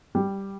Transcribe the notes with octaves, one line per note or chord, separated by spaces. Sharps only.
G3